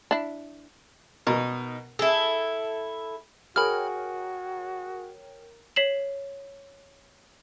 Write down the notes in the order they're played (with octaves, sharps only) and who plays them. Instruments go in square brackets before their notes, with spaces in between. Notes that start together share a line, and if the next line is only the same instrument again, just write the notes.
[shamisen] D4 E4
[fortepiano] B2 A#4 [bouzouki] D#4
[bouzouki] E4 A4 [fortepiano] G#4
[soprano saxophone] F#4 [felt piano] G#4 [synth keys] A#4 C#5 G5 [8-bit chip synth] B5 F6
[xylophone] C#5 B6 C7 E7 F#7